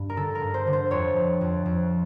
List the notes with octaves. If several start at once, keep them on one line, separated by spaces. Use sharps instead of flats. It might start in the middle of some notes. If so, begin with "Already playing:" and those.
Already playing: G2
A#4
D3 A4
A#4
G2
C5
D3
C5
F2 C#5
F2
F2
F2